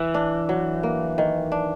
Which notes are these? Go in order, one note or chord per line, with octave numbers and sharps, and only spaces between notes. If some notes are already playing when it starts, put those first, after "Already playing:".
Already playing: E3
D4
F#3
A#3
D#3
D4